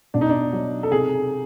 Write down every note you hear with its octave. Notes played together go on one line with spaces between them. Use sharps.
B2 D4
D#4
D4
F#3
A4
C3 G#4